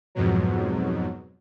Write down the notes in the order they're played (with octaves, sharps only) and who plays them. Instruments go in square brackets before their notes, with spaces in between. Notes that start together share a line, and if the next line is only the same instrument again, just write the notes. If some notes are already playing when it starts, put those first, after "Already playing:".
[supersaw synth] F2 G#2 B2 F#3